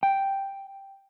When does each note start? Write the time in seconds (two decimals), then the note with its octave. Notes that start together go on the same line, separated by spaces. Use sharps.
0.03 G5